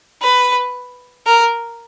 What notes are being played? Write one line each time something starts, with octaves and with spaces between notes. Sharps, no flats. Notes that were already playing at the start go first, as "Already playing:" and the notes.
B4
A#4